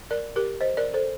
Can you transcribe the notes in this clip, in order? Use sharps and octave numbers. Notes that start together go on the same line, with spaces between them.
A#4 D5
G4 A#4
C5 D#5
A#4 D5
A4 C5